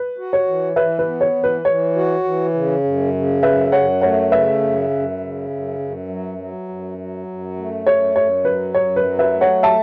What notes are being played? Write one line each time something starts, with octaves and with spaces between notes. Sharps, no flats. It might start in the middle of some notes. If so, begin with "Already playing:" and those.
Already playing: B4
F#4
C#5
E3
E3 B4 E5
B4
B3
C#5
E3
B4
E3 C#5
F#4
E3
C#3
F#2
C#3
F#2 B4 E5
F#2 C#5 F#5
A3 C#5 F#5
C#3 B4 E5
F#2
F#2
C#3
F#2
F#2
F#3
F#3
F#2
F#3
F#2
A3
F#2 C#5
F#2 C#5
F#3 B4
F#2 C#5
B4
F#3
B4 E5
A3
C#5 F#5
A3 E5 A5